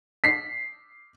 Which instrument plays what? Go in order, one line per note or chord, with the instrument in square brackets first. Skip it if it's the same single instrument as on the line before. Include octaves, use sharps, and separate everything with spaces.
[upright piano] B6 C7